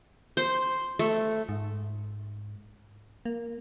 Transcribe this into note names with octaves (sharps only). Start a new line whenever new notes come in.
C5
A3
G#2
A#3